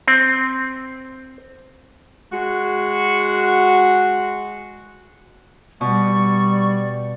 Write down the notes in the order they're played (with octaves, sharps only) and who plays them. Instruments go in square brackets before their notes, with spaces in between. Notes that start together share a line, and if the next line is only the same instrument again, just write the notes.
[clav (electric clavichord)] C4
[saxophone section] G#3 F#4
[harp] B2 [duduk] G3 [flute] D5 [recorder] C#6